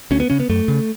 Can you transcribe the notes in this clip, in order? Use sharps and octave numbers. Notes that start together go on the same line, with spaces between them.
D2 C#4
B3
C#3 C#4
B3
F#2 A3
C#3